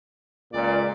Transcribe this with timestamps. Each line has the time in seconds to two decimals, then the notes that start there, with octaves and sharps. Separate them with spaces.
0.53 C#2 A#2 D5